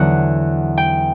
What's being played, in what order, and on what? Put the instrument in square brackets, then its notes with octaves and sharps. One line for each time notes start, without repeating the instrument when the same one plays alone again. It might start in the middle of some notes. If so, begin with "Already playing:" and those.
Already playing: [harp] E2 D3 F#3 F#5
G5